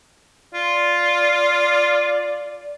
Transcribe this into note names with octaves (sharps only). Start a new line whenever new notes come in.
F4 D5